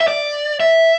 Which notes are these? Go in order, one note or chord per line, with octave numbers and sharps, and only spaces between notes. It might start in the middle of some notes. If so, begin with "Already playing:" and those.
E5
D5
E5